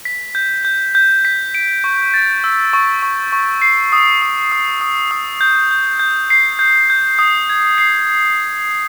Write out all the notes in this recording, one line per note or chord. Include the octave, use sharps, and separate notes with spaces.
B6
G6
G6
G6
B6
D7
C#6
A6
E6
C#6
C#6
C#6
C7
D#6
D#6
D#6
D#6
D#6
G6
G6
G6
C7
G6
G6
D#6
G#6
C7